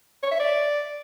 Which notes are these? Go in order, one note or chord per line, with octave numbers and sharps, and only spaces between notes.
C#5
E5
D5